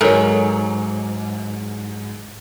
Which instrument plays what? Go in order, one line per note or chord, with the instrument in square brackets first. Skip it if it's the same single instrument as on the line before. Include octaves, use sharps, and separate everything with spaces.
[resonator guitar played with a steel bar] G#2 F#3 [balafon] A4 A#4 C#5